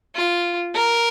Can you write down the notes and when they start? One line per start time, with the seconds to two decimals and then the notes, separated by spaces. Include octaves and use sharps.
0.15 F4
0.75 A#4